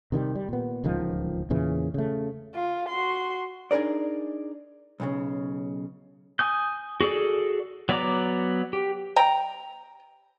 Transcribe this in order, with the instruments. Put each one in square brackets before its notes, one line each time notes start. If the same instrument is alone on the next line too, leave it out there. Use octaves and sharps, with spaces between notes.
[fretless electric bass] C3 D#3 F3 G3
G3
A#2 B3
D1 C#2 D#3 F3
E2 A#2 C#3 E3
C#3 A3
[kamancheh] F4
F#4 C6
[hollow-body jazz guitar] D4 D#4 G#4 A#4 D5
B1 A#2 C#3
[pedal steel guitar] G#5 D#6 G6
F#4 G#4 A4 D5
F#3 B3 D5 A#5 D6
G4
[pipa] G5 A#5